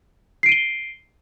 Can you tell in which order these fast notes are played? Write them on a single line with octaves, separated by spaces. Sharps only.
C7 D7 D#7 G7